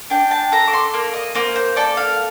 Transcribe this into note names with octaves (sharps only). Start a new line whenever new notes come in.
D4 G5
A5
A4 A#5
D6
C6
A#3
D#5
A#3 C5
C5
A4 D5
F5